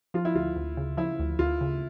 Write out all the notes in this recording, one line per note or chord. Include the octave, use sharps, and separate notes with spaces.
F3 F4
E4
D2 F4
D2
C#3
F3 E4
D2
D2 F4
C#3